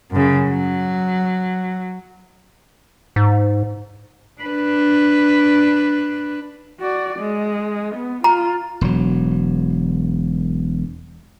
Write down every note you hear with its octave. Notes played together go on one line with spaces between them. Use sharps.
F#2 C#3
F#3
G#2
D4 B4
F#4 D5
G#3
B3
F4 A#5
E1 F#3